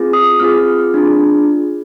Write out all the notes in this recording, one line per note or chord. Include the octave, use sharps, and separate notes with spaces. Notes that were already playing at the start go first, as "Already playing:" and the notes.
Already playing: C4 F4 G#4
D#6
C4 F4 G#4 F6
D4 F4 G#4